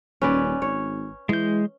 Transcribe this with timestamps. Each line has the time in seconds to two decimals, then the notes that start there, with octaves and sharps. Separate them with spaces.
0.22 D#1 C#4 B4 D5
0.62 G#1 C#5
1.29 E3 G#3 G6